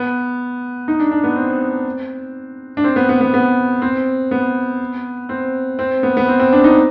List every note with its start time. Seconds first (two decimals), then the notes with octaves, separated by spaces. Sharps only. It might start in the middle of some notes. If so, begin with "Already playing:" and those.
Already playing: B3
0.88 D#4
1.00 D4
1.11 D4
1.24 B3
1.36 C4
2.77 D4
2.84 C4
2.96 B3
3.09 B3
3.21 B3
3.34 B3
3.82 C4
4.31 B3
5.29 C4
5.79 C4
6.03 B3
6.17 B3
6.28 C4
6.40 C4
6.53 D4
6.64 D#4